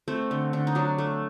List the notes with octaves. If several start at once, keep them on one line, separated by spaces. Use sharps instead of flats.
A3 C4
D3
D3
D#4
F#3 D4
A3